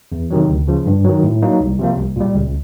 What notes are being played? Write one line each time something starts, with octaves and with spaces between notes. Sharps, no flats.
E2
C3 D#3 F#3
D2
C#3 F3
G2
D#3 F#3
A2
F#3 A#3 D#4
C2
C3 F3 A#3
C2
A#2 G3
C#2